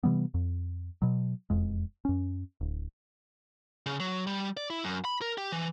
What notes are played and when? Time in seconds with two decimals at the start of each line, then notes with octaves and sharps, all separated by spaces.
0.04 C3 E3 G3 B3
0.34 F2
1.02 B2 F#3
1.50 E1 F2 G#3
2.05 F#2 C#4
2.61 D1
3.86 C#3
4.00 F#3
4.27 G3
4.57 D5
4.70 E4
4.84 F#2
5.05 B5
5.21 A#4
5.38 G4
5.52 E3